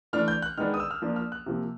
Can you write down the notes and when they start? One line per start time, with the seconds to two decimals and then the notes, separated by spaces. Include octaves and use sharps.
0.13 E3 A3 D4 F6
0.28 G6
0.42 F#6
0.57 D#3 G#3 B3 D4 F6
0.74 D#6
0.80 E6
0.91 F6
1.02 F3 A#3 D4
1.16 F6
1.32 F#6
1.46 C3 F3 A#3